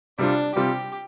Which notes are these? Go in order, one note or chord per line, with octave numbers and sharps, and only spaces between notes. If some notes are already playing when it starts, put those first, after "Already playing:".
C3 G3 C4 D4 F4
C3 G3 C4 F4 G4